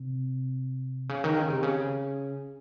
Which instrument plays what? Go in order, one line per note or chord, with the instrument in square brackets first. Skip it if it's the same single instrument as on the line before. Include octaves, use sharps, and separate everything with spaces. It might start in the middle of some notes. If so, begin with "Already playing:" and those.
Already playing: [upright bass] C3
C#3
D#3
C#3
C3
C#3